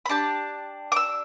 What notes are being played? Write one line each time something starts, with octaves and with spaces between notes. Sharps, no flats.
B5
D4 G4 A5
D6
E6